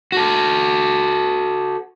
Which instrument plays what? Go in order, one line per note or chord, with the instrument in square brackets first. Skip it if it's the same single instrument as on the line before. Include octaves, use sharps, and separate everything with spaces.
[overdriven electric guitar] F#4 A4